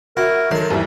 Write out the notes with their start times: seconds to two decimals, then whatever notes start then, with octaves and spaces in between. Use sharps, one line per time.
0.17 E4 F#4 A#4
0.51 D#3 F#3 A4 C6
0.70 D#2 E3 G3 E4